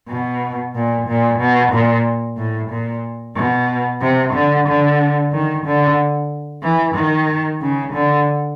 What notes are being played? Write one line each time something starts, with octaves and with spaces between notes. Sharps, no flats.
B2
A#2
A#2
B2
A#2
A2
A#2
B2
C3
D3
D3
D#3
D3
E3
D#3
C#3
D3